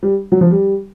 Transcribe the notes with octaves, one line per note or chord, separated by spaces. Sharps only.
G3
F#3
F3
G3